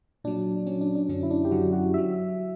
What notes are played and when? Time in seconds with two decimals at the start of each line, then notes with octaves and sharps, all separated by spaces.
0.24 A#2 F#3 D4
0.67 A#2 F#3 C#4
0.81 D4
0.95 D4
1.09 F#2 D3 F#3 C#4
1.23 E4
1.31 D4
1.45 G4
1.51 F#2 D3 F#3 F#4
1.73 F#4
1.94 F#3 E5